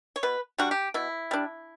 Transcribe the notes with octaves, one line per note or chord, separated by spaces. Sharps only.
C#5
B2 B4
G3 D4 F#4
G4
B2 E4
G3 D4